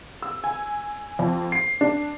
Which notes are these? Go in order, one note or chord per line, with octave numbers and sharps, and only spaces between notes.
E6
G#5
F2
C7
D4